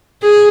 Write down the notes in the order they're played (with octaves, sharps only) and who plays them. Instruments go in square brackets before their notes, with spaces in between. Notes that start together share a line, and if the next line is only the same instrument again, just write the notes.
[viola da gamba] G#4